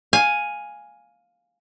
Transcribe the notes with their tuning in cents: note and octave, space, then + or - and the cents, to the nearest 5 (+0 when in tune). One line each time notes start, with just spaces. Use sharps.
F5 +10 G#5 +0